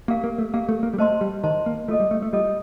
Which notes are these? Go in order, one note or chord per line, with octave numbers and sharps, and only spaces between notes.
A#3 G4 A#4 F5
A#3
A3
A#3 G4 A#4 F5
A3
A#3
G3
A3 C5 D#5 A5 C6
G3
D#3 C5 D#5 A5 C6
A#3
A3 F4 A4 D#5
G3
A3
A3
G3 F4 A4 D#5